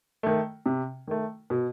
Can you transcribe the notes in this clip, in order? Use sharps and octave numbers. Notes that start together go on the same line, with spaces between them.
D#3 A3
C3
D#3 A3
B2